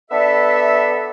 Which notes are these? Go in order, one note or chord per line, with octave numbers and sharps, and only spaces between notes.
B3 D4 A4 E5